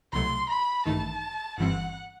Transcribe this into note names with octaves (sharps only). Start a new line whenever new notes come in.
C2 B2 F#3 A3 C6
B5
A1 G2 D#3 A3 D#4 A5
G1 G2 E3 G3 C4 F#5